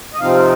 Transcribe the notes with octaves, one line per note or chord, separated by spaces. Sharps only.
D#5
C3 F3 C4 D#4 F5